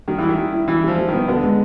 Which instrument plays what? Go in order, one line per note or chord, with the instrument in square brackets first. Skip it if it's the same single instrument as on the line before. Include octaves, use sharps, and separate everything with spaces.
[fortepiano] D#3 [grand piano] G3
[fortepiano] E3 [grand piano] E4
[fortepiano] D#3
[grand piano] G3
E4
[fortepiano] E3 [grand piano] E4
[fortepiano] F3 [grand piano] G3
[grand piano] G3
[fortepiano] D#3
[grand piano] B3
[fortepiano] D3 [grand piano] B3
[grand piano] G#3